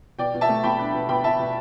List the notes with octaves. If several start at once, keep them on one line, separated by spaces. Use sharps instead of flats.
B2 D5 G5
B2
E5 A5
A3
B2 G5 B5
D4
B2
B2 G5 B5
B2 E5 A5
B2